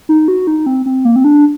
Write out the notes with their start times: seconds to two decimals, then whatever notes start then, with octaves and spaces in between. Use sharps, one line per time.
0.09 D#4
0.28 F#4
0.47 D#4
0.66 C4
0.86 C4
1.05 A#3
1.16 C4
1.24 D4